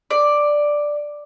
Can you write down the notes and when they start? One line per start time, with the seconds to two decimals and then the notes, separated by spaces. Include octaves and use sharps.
0.11 D5